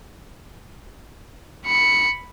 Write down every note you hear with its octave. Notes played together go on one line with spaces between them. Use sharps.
B5 C#7